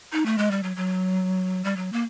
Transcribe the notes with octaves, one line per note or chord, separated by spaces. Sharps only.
D#4
A3
G#3
G3
F#3
F#3
G3
F#3
A#3